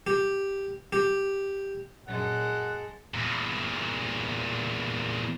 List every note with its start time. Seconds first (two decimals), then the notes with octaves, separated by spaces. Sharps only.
0.07 G4
0.93 G4
2.07 F#2 A#2 F#3 G#3 A4 F#5
3.14 E2 A#2